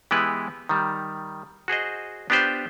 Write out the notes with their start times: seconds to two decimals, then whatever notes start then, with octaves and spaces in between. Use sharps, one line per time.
0.11 E3 G#3 B3 E4 G4 B4
0.69 D#3 G3
1.68 F#4 G#4 C5 D#5
2.30 B3 D4 F4 G4 B4 C5